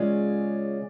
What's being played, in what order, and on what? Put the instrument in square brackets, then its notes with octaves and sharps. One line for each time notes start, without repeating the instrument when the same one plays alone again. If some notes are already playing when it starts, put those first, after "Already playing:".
Already playing: [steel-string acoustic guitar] C#3 G#3 C#4 F4 [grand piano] D5